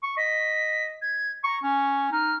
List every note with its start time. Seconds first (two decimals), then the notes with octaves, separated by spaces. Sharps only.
0.03 C#6
0.17 D#5 B6
1.02 G#6
1.44 A#5 C#6
1.63 C#4 C#6
2.12 D#4 F6